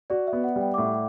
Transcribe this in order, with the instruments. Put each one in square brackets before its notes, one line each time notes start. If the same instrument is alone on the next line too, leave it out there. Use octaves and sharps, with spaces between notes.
[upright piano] F#4 [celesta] D5
[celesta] E5
[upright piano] B3
[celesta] F#5
[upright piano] G3
[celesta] G5
D6
[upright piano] A2 [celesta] C#6